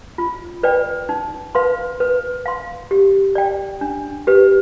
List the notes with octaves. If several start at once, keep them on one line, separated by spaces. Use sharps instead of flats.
F4
B4 D5 G5
D#4
B4 F5 C6
B4
F5 C6
G4
D5 G5
D4
G4 B4